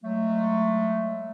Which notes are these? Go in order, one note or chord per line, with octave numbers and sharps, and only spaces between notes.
F#3 G#3 A3